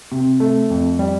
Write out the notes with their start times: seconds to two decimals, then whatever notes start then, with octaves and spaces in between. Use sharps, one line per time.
0.12 C3
0.40 A3
0.70 F2
0.99 G3